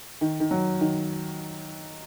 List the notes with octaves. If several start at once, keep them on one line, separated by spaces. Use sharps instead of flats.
D#3
D#3
F#3
D#3